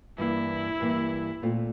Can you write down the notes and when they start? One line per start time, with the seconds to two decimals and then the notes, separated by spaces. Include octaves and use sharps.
0.18 G2 E3 A#3 E4
0.80 G2 E3 A#3
1.42 A#2 A3 C4 F4